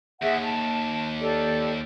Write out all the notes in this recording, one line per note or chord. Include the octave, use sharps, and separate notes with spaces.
D#2 G#4 E5 F#5
A5
G4 A4 D5